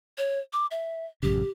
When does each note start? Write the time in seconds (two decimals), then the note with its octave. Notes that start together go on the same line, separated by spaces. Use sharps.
0.18 C#5
0.53 D6
0.71 E5
1.23 A1 F#2 C#3 G4